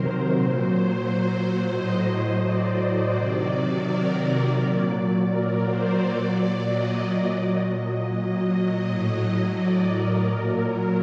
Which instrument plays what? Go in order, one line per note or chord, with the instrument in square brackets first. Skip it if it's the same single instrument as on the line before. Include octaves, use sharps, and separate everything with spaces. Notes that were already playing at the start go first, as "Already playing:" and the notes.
Already playing: [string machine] C3 D#3 F#3 A#4 C5
A#2 F#3
A2 F#3 D#5
D5
C3 D#3 F#3
A#4
D5
A#2 F#3
A#4
C5
A#2 F#3 D5
D#5
A#2 F#3
A2 F#3
D5
A#4
A#2 F#3 A#4